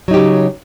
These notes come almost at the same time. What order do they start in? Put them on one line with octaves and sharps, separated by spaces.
F#3 D#4 G4 C#3